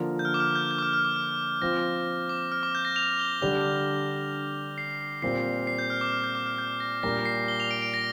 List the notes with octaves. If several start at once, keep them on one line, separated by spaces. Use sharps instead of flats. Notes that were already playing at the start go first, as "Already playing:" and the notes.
Already playing: D3 F3 A#3 F4 A#4
G6
F6
D6
F6
G6
G6
D6
F6
F6
D6
F6
F3 C4 F4 A#6
D6
F6
D6
G6
A#6
F7
G7
D3 G3 D4 G4 F7
C7
A#2 G3 C4 F4 A#4 C7
C7
G6
F6
D6
F6
G6
D6
F6
G6
A#6
A#2 G3 D4 A#4 A#6
C7
G7
F7
D7
D7
A#6